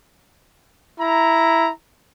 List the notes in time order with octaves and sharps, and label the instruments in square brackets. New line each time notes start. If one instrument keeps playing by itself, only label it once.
[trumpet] E4 [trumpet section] A#5